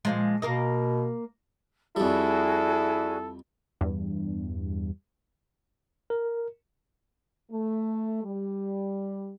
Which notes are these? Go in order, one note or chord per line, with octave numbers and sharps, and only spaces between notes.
A#2 F3 G#3
B2 A#3 A#4 D#5
F2 G3 E4 F#4 G#4 A4 D5
E2 G2
A#4
A3
G3